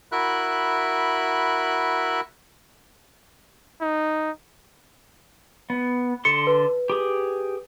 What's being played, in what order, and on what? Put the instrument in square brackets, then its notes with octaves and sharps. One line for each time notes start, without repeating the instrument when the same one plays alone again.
[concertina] E4 F#4 A#4 E5 B5 F#6
[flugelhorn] D#4
[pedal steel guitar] B3
[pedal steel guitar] D3 A4 C6 [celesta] C#7
[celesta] B4
[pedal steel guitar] G4 G#4